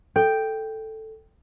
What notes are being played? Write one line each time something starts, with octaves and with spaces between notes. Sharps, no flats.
A4 G5